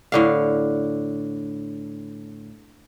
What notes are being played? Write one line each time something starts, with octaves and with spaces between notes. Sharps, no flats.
A2 D3 F5